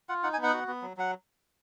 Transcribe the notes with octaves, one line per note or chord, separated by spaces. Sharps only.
F4 F#5
D#4 F#5
G#5
B3
F#5
F#4
B3
F#3
F#3 F#5